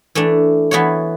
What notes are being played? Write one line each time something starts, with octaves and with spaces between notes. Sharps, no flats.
E3 A3 D4
E3 B3 F#4 C#5